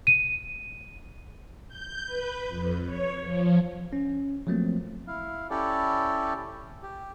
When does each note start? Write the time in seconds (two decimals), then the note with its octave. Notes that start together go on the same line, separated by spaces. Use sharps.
0.07 D#7
1.68 G6
2.06 B4
2.48 F2
2.85 C#5
3.23 F3
3.93 C#4
4.47 F3 F#3 A3 A#3 C4
5.07 E4 F5
5.50 C#4 E4 G4 A4 C#5 D5
6.83 G4